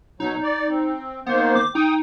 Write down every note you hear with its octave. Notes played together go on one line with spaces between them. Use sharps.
B2 F#3 D#4
D5
C4
D#3 A#3 B3 C5
D6
D#4 G5 D#6